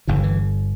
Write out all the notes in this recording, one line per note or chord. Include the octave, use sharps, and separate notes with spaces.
G1 G2 D3 E3
E3